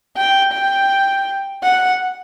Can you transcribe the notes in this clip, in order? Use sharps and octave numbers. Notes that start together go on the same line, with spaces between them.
G5
G5
F#5